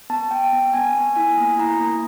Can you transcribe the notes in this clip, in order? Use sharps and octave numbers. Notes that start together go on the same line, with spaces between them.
B3 A5
B3 G5
B3
B3 G#5
B3
E4 G#5
A#3
E4 A#5
A#3